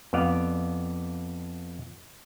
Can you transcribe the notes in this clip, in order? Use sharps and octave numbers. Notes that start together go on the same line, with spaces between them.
F2 B3 D5 F5